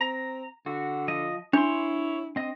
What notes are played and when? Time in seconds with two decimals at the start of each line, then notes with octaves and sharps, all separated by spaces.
0.01 C4 A#5
0.66 D3 F#4
1.08 F3 D#5
1.53 D4 E4 C#5 C6
2.36 C4 D#5